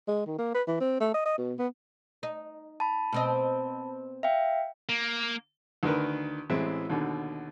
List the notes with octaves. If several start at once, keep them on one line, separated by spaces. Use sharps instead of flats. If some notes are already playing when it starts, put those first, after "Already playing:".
G#3
D#3
A#3
B4
E3
C4
A3
D#5
D#5
B2
B3
D#4
A5 B5
B2 C4 D#5
E5 F5 G5
A#3
D2 D#3 A#4 B4
A1 E3 G#3 C4 E4 E5
D#2 B2 D3